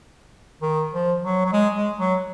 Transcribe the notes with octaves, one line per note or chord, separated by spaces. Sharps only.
D#3
F3
F#3
F#3
G#3
G#3
F#3